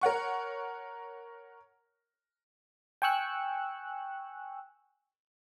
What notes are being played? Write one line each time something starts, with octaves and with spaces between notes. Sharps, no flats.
A#4 C#5 F#5 C#6
G5 G#5 C#6 E6 F#6